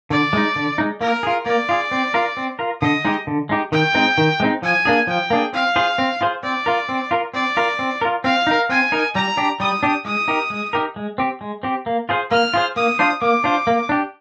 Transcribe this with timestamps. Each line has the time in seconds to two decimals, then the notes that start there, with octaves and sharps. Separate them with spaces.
0.10 D3 D5
0.33 G#3 D#4
0.56 D3
0.78 G#3 D#4
1.01 A#3 A#4
1.23 F4 G#4
1.46 A#3 D5
1.69 F4 G#4
1.91 C4
2.14 F4 A#4
2.37 C4
2.59 F4 A#4
2.82 D3 D#5
3.05 G#3 D#4 G4
3.27 D3
3.49 G#3 D#4 G4
3.72 D#3 G5
3.94 G#3 C4 D#4
4.18 D#3
4.40 G#3 C4 D#4
4.62 F3 G#5
4.85 A#3 D4 G#4
5.07 F3 G5
5.30 A#3 D4 G#4
5.53 C4 F5
5.76 F4 G#4 C5
5.98 C4
6.21 F4 G#4 C5
6.43 C4 D5
6.66 F4 A#4
6.89 C4
7.11 F4 A#4
7.34 C4 D5
7.57 F4 A#4
7.79 C4
8.01 F4 A#4
8.24 C4 F5
8.47 D#4 A#4
8.69 C4 G#5
8.92 D#4 A#4
9.15 G3 A#5
9.37 D4 G4
9.60 G3 D#6
9.83 D4 G4
10.05 G#3 D#6
10.28 D#4 G4 A#4
10.50 G#3
10.73 D#4 G4 A#4
10.96 G#3
11.18 C4 G4
11.41 G#3
11.63 C4 G4
11.86 A#3
12.09 F4 G#4 C5
12.31 A#3 F6
12.54 F4 G#4 C5
12.76 A#3 D#6
12.99 D4 F4 C5
13.22 A#3 D6
13.44 D4 F4 C5
13.67 A#3
13.89 D4 G4